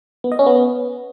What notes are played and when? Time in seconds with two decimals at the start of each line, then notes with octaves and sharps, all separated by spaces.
0.24 B3
0.32 D#5
0.39 C#4
0.46 B3